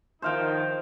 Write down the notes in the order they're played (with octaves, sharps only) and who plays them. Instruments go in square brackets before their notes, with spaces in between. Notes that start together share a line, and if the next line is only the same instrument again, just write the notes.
[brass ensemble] D#3 F3 D#4 [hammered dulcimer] C5 F5 G5